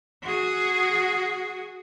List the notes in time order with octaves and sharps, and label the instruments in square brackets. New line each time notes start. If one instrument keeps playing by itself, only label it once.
[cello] F#4 G#4